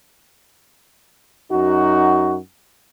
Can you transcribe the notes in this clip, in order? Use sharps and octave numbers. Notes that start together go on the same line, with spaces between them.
F#2 D#4 F#4